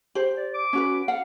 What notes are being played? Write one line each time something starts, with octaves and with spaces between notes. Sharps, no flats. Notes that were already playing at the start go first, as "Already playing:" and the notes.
G4 C5
D5
D6
C#4 F#4 B4
F5 F#5